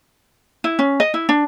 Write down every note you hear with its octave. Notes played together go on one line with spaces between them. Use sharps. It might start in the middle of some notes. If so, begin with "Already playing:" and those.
E4
C#4
D#5
E4
D4